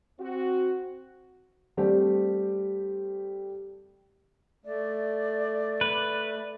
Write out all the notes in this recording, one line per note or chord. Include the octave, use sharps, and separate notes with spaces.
C4 F#4
G3 A3 C4 D4 G4
A3 D5
B4